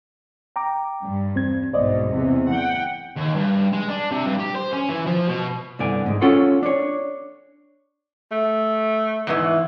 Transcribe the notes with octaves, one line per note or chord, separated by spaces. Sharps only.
G5 A#5 D6
G2
E2 C4 G#6
B1 G#2 B2 C5 D5 D#5
E2 C3 E3
F#5 G5
D#2
G2
G#3
D4
C3
G2
G4
C5
C#4
E3
F3
B2
C2 G2 D3 B3 D5 G#5
G#2 G#3
C#4 F4 A4 C#5 F#5 C6
D4 C#5
A3
E2 G#2 E3